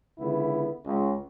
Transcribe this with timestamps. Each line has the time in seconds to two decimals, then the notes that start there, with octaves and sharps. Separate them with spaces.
0.18 C#2 D3 B3 E4
0.86 C#2